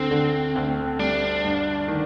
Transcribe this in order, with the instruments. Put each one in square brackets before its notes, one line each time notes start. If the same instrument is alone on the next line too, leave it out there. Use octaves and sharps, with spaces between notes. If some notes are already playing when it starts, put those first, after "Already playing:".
Already playing: [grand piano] D2 D3 [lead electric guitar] C4
[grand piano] D3
D2
[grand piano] G3 [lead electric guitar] D4
[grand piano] G2
D#3